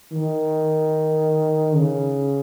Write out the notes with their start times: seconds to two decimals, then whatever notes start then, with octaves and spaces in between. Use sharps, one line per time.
0.12 D#3
1.76 C#3